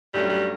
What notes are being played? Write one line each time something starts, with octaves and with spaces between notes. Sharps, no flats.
G2 F#3 G3 A3 C#4
G3